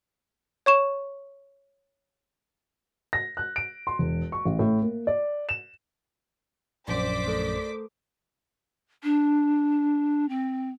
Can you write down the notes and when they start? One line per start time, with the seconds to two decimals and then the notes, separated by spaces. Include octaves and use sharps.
0.66 C#5 C#6 E7
3.13 A#6
3.37 F#6
3.56 D7
3.87 C6
3.99 E1
4.32 C#6
4.45 A1
4.59 A2
4.82 A#3
5.07 D5
5.49 E7
6.88 A#1 F#2 C5 D5 D6 B6
7.26 A3 A4 A#4
9.03 D4
10.29 C4